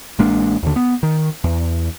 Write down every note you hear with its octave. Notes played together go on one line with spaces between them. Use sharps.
A1 G#3 A#3 D4
D#2 D3
B3
D#3
E2